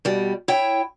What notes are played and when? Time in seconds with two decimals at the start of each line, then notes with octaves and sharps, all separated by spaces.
0.05 B2 G3
0.48 E4 C#5 G5